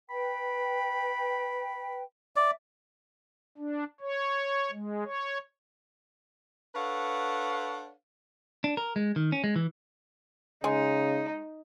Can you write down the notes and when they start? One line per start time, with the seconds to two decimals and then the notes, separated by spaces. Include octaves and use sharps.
0.10 B4 G5 B5
2.36 D5 E5
3.58 D4
4.01 C#5
4.71 G#3
5.04 C#5
6.75 D4 A4 B4 C#5 F5 F#5
8.64 D4
8.77 A#4
8.96 G#3
9.16 D#3
9.32 C#4
9.44 G#3
9.56 E3
10.64 C#3 G#3 D#4